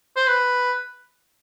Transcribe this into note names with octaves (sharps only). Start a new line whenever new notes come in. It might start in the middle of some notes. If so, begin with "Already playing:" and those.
C5
B4